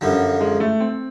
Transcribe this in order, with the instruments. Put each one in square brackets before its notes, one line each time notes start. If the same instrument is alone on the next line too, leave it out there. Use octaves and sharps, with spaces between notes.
[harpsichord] F#2 D3 F3 [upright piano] G3
[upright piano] G#3
A3
C4